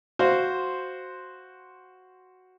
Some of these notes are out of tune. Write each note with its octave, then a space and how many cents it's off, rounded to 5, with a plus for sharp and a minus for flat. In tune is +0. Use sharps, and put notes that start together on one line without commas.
F#4 +0 C5 +0 F5 +0